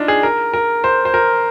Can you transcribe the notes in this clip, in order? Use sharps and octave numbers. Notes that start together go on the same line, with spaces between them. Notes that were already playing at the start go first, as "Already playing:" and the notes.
Already playing: D4 D#4 F4
G#4
A#4
A#4
C5
C5
A#4